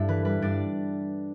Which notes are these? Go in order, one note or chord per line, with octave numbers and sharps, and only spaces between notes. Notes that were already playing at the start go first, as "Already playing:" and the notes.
Already playing: G2 D4 E4 A4 D5 E5
E3 B4
G3 B4
G2 D4 D5